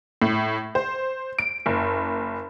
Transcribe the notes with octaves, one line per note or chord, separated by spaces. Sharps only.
A2
C5
D7
F#1